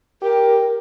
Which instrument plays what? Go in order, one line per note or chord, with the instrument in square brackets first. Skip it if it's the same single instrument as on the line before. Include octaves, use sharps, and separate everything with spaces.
[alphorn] G4 [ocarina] A#4